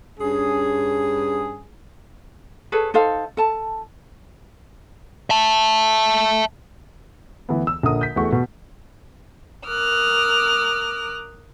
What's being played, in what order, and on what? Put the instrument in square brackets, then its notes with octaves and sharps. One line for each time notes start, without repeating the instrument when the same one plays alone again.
[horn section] G2 C#4 G#4
[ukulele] G#4 A4 B4 C#5
D#4 A4 C5 F5
A4 A5
[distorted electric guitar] E5 A5
[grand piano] D2 E3 B3
E6
A#1 D3 A#4 D#6
G6 B6
E2 A3 F#4 G#4 C#6
B2
[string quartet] A#4 D6 D#6 F6 F#6